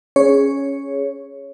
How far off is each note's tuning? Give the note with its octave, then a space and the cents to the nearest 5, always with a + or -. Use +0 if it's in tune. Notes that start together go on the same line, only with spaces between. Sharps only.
C#4 +0 G#4 +0 C#5 +0